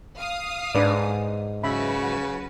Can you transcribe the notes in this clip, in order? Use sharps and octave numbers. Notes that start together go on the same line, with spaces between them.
F5 D#6
G#2 D4 B4 D5
C#3 F#3 F#4 B4 E5 B5